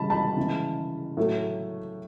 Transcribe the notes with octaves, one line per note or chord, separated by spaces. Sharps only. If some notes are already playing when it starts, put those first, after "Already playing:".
Already playing: C#3 E3 G3 A5 B5
A5 B5
C#3 E3 G#3
A2 F#3 A3